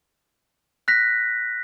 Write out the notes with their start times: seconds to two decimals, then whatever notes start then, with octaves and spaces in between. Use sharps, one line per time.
0.88 F#6 A#6 B6